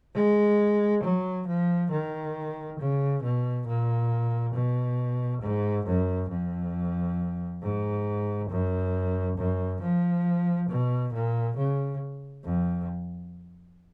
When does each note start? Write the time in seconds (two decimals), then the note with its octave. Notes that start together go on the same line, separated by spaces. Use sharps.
0.15 G#3
1.03 F#3
1.47 F3
1.91 D#3
2.80 C#3
3.23 B2
3.67 A#2
4.55 B2
5.42 G#2
5.86 F#2
6.30 F2
7.62 G#2
8.50 F#2
9.37 F#2
9.82 F3
10.70 B2
11.13 A#2
11.57 C#3
12.45 F2